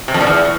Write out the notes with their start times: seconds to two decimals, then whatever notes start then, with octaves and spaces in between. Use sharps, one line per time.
0.08 C3
0.14 F2
0.21 A#2
0.27 E2